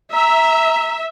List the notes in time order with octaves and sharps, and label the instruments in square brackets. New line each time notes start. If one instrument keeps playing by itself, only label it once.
[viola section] E5 [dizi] A#5